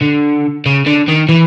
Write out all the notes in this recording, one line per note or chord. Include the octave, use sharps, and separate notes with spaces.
D3
C#3
D3
D#3
E3